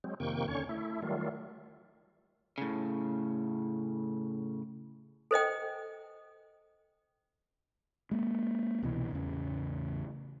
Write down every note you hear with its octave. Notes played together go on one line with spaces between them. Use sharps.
F#3 G#3 C4
F2 C3 D#3 A#3 G5 C#6
D#2 D3 C#4 C#5 C#6
A3 E4
D#3 F#3 G3 A3 F4
A2 C#3
A4 C5 D#5 G5
G#3 A#3
C2 B2 D#3 E3
A1 E2 C#3